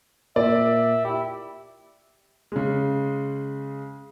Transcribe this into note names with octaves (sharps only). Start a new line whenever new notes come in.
A#2 A#4 D5 E5
E4 G4
C#3 G#3